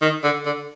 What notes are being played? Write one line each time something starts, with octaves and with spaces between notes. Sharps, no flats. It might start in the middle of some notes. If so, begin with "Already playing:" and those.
D#3
D3
D3